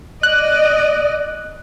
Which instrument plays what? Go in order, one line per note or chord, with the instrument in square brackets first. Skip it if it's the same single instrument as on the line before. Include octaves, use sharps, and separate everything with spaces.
[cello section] D5 D#5 [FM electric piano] F#6